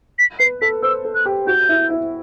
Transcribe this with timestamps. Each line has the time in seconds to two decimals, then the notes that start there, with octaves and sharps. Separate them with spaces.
0.19 B6
0.39 B4 C7
0.62 A4 B6
0.83 C5 E6
1.05 A4
1.15 F#6
1.26 G4
1.47 F#4 G6
1.69 E4
1.90 E4